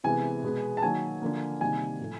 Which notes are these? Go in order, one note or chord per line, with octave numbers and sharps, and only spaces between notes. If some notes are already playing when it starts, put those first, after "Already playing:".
C3 E3 G#3 B3 G#5
B2 G#3 B3
A5
D#3 F#3 A#3 G#5
D3 F3 A#3
C3 D#3 G3 A#3 G#5
A2 F3 A3